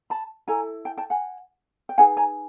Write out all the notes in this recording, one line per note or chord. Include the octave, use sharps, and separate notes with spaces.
A5 B5
E4 A4 G#5 A#5
G5 A5
G5 A5
F#5 G#5
G5
D#4 G#4 B4 F#5 G#5
G#5 A#5